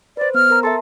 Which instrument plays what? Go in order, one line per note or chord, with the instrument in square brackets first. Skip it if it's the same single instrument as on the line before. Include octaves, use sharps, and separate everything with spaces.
[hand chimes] B4 C5 [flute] D5
[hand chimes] B3 [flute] F6
[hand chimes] A#4 A#5
[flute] A4 [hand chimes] E5 A5 C6